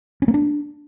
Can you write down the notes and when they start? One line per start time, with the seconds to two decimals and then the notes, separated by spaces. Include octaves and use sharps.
0.22 C#4
0.28 A#3
0.34 D4